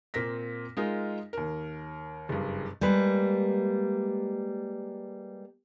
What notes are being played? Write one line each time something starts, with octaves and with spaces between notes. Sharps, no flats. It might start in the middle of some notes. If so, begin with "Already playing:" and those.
A#2 A#3 C4 A#6 B6
G#3 D#4 F4 G#4 A#4
D#2 A#4
F#1 G2
G3 G#3 A#3 B4